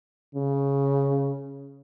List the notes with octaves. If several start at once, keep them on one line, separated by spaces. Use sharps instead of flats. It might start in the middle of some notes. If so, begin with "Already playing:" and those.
C#3